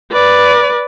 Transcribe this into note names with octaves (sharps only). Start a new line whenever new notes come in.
B4 D5